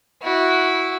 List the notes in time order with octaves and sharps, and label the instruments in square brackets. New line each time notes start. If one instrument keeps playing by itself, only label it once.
[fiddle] E4 F#4